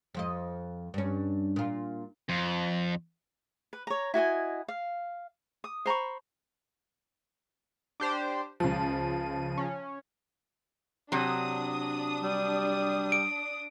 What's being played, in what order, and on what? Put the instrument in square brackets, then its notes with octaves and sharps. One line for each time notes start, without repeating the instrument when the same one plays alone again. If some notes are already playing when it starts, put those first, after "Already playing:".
[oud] F2 F3 D#5
G2 C#4
A#2 F4
[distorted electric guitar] F2
[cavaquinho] B4
C#5 A#5
E4 F#4 D#5 G#5
F5
D#6
C5 A#5 B5 C#6
[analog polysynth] D4 G4 C5
[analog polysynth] C#2 D#7 [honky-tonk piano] C#3 F3
[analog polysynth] C#4
[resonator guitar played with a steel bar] C3 F#3 [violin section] D4 D#6
[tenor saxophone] G3
[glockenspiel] D7